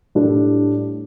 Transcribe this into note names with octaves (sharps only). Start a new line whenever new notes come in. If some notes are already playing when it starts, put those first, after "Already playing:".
A2 G3 D4 A4